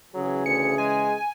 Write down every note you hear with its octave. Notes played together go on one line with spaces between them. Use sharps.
C#3 E3 F#3 G#4
D2 C#7
G#3 G#5